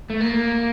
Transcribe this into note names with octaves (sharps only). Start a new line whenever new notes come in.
A3
A#3